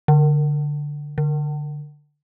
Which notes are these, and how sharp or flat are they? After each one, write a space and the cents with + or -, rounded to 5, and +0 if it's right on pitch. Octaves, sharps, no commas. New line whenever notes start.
D3 -5
D3 +0